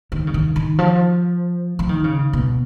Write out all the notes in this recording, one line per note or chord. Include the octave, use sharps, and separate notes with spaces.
D#3
C#3
D#3
D#3
F3
F3
D#3
C#3
B2